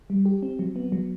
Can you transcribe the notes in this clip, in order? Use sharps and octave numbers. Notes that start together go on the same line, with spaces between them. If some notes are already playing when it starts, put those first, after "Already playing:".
G3
G4
C4
F#3
B3
F#3